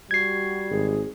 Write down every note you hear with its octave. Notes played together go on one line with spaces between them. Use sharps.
G3 F#4 G#6 C7
G#1 G#4